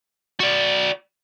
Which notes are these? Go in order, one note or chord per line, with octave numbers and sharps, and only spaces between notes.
F#4 D5